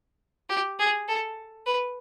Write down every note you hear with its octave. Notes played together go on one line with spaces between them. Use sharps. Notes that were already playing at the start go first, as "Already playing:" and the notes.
G4
G#4
A4
B4